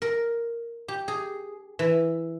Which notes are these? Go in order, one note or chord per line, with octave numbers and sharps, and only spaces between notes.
A#4
G4
G#4
E3